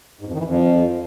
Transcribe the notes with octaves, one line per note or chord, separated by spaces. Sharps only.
G#2
F2
D#3
E3
F2